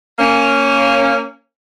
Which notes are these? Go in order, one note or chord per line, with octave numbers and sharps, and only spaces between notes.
A#3 C#4